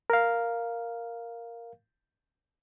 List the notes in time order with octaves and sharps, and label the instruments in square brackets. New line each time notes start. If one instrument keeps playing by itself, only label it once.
[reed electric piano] A#4 F5